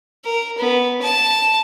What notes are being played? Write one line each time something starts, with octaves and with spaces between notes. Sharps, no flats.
A#4
B3
A5